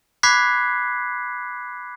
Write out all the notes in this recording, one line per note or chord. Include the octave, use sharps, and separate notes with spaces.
B5 D6 F#6 G#6 B6 C7